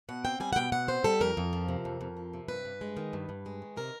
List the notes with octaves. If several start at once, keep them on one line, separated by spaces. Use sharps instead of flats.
B2 F#5
C4 G5
G3 G#5
F#5
B2 G5
B2 F#5
C4 C5
G3 A4
F2 A#4
F2
F3
C3
F2
F2
F3
C3
G2 B4
G2
G#3
D#3
G2
G2
G#3
D#3
C3 A#4